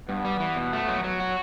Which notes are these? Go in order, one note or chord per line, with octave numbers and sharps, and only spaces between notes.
G2 B3
G3
E3
B2
A3
F#3
F#3
F#4